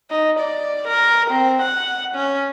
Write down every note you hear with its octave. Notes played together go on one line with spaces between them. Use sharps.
D#4
D5
A#4
C4
F#5
C#4